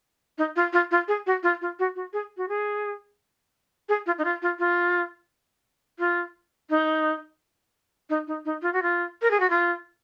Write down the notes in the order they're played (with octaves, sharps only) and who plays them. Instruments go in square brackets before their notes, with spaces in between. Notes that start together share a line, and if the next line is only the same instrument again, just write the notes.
[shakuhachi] D#4
F4
F4
F4
G#4
F#4
F4
F4
F#4
F#4
G#4
F#4
G#4
G#4
F4
D#4
F4
F4
F4
F4
D#4
D#4
D#4
D#4
F4
F#4
F4
A#4
G#4
F#4
F4